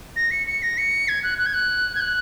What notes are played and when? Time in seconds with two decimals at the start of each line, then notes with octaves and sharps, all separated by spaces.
0.16 A#6
0.31 C#7
0.46 C#7
0.62 A#6
0.77 C#7
1.08 G#6
1.23 F#6
1.38 F#6
1.46 G#6
1.53 F#6
1.95 G#6
2.00 F#6